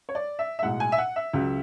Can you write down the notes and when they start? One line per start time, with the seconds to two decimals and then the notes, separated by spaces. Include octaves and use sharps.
0.09 C#5
0.15 D5
0.39 E5
0.59 E5
0.62 B1 A2 G#3 F#5
0.80 G#5
0.92 E5
0.98 F#5
1.16 E5
1.34 C#2 C#3 F#3